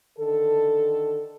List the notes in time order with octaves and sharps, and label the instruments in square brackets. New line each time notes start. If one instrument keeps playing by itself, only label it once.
[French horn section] D3 D#3 A4